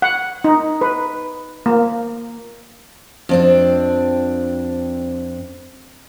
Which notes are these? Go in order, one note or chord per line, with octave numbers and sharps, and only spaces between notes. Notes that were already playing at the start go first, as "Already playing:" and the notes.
F#5
D#4
B4
A#3
F2 C4 D4